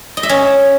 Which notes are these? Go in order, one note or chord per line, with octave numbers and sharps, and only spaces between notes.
D#5
E5
C#4